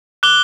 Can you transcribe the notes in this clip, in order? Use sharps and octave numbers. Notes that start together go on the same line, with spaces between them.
D6 F#6 G7